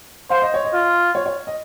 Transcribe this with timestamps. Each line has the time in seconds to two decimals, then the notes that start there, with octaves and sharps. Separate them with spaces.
0.30 C5 F5
0.42 D#5
0.54 C#5
0.65 D#5
0.73 F4
1.15 C#5
1.26 C#5
1.47 D#5